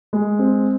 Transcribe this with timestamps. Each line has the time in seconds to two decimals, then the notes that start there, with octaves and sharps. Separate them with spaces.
0.13 G#3
0.39 C4